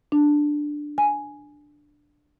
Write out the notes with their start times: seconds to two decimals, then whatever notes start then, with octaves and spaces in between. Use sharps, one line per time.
0.12 D4
0.98 G#5